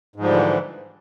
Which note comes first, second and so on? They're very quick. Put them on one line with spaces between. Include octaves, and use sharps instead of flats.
G#2 F3 G3 D3 E3